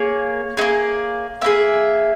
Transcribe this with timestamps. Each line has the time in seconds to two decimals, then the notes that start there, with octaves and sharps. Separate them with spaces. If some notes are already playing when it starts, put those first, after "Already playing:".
Already playing: A#3 G#4 C#5
0.57 D#4 G#4
0.61 A#3
1.41 A#3 D#4 G#4 E5